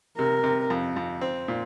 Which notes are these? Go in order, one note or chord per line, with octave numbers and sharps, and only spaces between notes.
C3 A#4
C3
F2
F2
C4
A#2